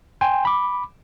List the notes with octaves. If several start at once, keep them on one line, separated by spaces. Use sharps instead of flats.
G5 G#5 C6
B5 D6